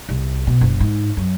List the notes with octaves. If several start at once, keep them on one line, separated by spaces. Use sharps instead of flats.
C2
B2
F#1
G#2
F#2